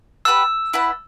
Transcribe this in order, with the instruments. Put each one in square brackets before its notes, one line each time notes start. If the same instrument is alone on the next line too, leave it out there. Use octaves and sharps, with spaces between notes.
[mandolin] G4 B4 F#5 A5 [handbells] E6
[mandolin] E4 B4 F#5 A5